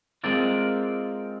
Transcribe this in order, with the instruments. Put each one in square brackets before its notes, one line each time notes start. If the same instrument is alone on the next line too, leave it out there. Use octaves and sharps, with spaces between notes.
[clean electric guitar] G#3 C4 F4 A#4 D5